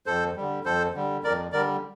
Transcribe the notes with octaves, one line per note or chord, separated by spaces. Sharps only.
F2 A4 C5
D3 G3
F2 A4 C5
D3 G3
F2 A#4 D5
D3 G3 A#4 D5